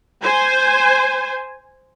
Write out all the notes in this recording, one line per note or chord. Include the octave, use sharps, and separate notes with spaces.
C5 G#5